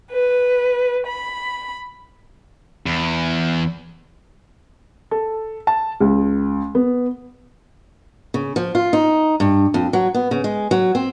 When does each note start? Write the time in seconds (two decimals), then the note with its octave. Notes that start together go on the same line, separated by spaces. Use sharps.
0.12 B4
1.06 B5
2.86 E2
5.11 A4
5.67 A5
6.00 C#2
6.75 B3
8.34 C#3
8.56 F3
8.75 F4
8.93 D#4
9.40 G2
9.74 F2
9.93 F#3
10.14 B3
10.31 C#3
10.44 G#3
10.71 F#3
10.95 C4